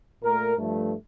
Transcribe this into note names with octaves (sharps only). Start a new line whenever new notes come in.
A#2 A3 A#4
G2 F3 A3